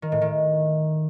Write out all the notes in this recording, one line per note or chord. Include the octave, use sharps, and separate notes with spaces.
D#3
A2
D#3